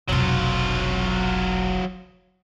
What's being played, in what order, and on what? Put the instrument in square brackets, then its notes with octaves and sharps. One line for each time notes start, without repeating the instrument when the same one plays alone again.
[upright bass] F1 B1 [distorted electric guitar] F#3 F4